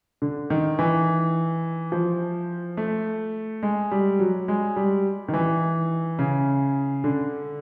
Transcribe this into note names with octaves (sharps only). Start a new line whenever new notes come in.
D3
D#3
E3
F3
A3
G#3
G3
F#3
G#3
G3
D#3
E3
C#3
D3